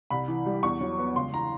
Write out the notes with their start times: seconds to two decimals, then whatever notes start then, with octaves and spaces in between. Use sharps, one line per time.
0.10 C2 B5
0.28 E3
0.46 G3
0.63 E2 C#6
0.81 F#3
0.98 B3
1.16 C#2 C6
1.34 E3 A#5